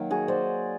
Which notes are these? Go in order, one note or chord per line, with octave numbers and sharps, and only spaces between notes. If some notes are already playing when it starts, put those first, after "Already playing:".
Already playing: D#3 F#3 A#3
F#4 G#4
C5 D5